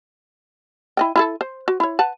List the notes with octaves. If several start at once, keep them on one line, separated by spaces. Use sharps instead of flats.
E4 D#5 G5
E4 G#4 A4
C5
F#4
E4 C#5
B4 F#5 A5